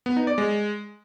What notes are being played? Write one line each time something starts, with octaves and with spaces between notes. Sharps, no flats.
B3
D#4
D5
G#3